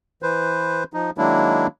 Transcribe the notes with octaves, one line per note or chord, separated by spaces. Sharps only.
E3 B4 C5
F3 D#4
D#3 F#3 G#3 A#3 D4 E4